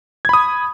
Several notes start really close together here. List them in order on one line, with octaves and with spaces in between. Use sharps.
G#6 B5 D#6